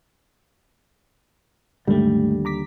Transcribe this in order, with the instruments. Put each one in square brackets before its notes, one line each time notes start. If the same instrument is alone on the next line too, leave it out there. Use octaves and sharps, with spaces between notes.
[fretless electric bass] D#2 D3 G3 [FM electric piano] G#2 A3
[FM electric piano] A#5 D6 B6